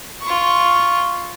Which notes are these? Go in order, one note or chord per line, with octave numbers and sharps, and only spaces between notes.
F4 C#6